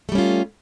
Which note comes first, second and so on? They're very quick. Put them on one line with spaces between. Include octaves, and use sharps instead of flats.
A3 G3 C#4 F4